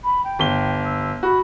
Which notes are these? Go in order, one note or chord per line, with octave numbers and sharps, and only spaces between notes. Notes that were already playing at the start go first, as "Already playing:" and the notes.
B5
G5
G1 G7
E6
F#4 B5